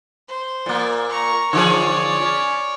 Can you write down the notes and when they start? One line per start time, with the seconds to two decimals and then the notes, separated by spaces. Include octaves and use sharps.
0.28 C5
0.66 A#2 A#3
1.09 A#5 C#6
1.53 D3 F3 G#4 C#5 D5
2.21 C#4